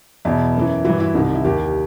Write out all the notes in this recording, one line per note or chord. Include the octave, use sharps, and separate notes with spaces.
E2 B2 E4
F#2 E3
G2 E3 F#4
E4
C2 C3 D#3 D#4
D#4
E4
D#2 D#3 G4